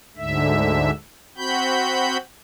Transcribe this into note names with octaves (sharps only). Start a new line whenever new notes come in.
D2 G#2 D3 E5
C4 F#4 B5 G6